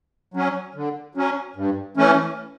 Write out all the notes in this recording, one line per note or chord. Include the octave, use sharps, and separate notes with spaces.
F#3 C#4
D3
F#3 C#4
G2
E3 A3 C#4